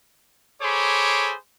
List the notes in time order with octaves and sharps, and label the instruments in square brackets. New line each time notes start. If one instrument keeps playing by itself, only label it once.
[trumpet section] G#4 A4 C5 C#5 B5 D6